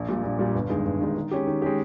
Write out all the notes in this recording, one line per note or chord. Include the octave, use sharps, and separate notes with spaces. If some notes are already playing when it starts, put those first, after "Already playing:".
Already playing: A#1
A#2 G3
A#1
A#2 G3
G1
G2 D#3 G#3
G1
G2 D#3 G#3
D#3
G#3 C#4 G4
D#3
G#3 C#4 G4